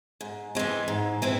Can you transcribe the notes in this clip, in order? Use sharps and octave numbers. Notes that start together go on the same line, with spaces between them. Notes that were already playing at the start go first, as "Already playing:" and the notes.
G#2
E3 G#3 C4
G#2
E3 G#3 C4